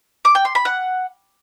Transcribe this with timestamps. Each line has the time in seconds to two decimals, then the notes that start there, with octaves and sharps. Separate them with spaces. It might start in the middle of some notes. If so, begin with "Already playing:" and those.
0.25 D6
0.35 G5
0.45 C6
0.55 B5
0.65 F#5